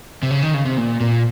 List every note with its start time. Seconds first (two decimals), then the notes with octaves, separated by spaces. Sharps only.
0.23 C3
0.31 C#3
0.42 D#3
0.54 C#3
0.66 C3
0.78 A#2
1.01 A#2